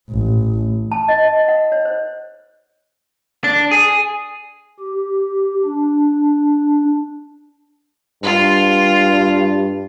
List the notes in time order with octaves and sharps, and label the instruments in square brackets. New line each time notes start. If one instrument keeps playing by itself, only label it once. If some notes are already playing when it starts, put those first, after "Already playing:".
[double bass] A1
[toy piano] A5
D#5
D#5
D#5
F#5
C#5
C5
[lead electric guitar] D4
G#4
[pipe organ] G4
D4
[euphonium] G2 [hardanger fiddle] F4